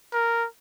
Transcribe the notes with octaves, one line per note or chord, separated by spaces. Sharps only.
A#4